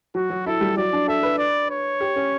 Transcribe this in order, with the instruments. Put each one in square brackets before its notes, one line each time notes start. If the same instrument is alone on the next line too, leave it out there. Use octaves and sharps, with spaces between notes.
[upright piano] F#3 [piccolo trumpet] F#4
[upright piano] F#3
[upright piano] E4 [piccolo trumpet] A4
[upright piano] G3
[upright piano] F#3 [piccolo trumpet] D5
[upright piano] D4
[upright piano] A4 [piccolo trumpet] E5
[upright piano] B4
[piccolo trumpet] D5
C#5
[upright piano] G4
C#4